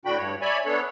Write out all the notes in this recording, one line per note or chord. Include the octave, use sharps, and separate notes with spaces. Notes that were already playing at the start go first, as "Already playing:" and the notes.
A2 D3 D4 F#4 G5 B5
G2 C#5
C#5 D5 E5 G#5 B5
B3 D4 A4 C#5